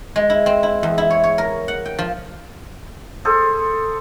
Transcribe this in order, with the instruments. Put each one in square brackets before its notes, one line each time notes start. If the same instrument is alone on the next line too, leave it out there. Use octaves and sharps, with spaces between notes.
[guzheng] G#3
E4
C4
E4
E2
E4
C#5
C#5
A#4
F#5
G5
F3
[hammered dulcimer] G#4 A4 C5